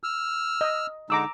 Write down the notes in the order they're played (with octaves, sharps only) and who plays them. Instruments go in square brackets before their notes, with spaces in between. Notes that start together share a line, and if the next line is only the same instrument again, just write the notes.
[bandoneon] E6 F6
[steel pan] D#5
[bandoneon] D3 G#3 D#4 [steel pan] A#5 D6 E6